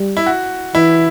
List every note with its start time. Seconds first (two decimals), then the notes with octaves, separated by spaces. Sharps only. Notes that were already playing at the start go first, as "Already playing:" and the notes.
Already playing: G3
0.17 E4
0.26 F#4
0.74 E3 E4